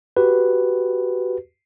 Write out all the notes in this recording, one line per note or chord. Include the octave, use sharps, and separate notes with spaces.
F#4 G4 B4